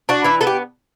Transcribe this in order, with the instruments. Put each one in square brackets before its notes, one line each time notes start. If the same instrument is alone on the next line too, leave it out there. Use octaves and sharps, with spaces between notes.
[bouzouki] D4 F#4
E3 E4
B3 A4
G4